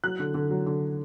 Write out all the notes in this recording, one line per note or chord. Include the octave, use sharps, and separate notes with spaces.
F#3 F#6
D3
D3
F#3
D3